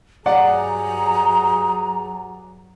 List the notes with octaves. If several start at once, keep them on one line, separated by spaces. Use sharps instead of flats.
G2 F#3 G#4 D5 F#5 A#5